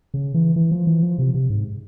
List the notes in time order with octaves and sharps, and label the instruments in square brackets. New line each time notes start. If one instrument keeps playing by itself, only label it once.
[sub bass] C#3
E3
E3
F3
E3
F3
C3
C3
G#2